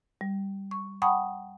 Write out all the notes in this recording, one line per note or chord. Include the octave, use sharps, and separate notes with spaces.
G3
C#6
F#5 G5 A5 B5 C#6 D#6